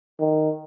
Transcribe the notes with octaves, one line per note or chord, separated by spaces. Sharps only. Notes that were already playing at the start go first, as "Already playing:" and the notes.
D#3